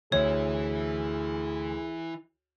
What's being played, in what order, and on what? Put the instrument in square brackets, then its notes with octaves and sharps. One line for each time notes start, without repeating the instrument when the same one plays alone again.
[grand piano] D2 [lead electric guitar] E3 E4 [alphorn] G#4 [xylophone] C#5